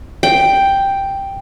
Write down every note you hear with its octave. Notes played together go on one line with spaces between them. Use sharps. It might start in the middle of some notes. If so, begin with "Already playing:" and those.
G5